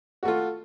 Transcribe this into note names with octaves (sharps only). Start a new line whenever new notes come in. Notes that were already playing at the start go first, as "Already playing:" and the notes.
A3 F4 F#4